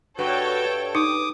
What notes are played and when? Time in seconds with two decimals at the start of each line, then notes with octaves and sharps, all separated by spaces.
0.19 G2 F#4 A4 B4 C#5 G5
0.95 D#4 D6 D#6